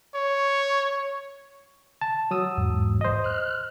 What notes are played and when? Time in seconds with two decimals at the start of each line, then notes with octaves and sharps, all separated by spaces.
0.14 C#5
2.01 A5
2.31 F#3 D#6 E6
2.58 E2 G#2
3.01 C5 D#5
3.24 F6 F#6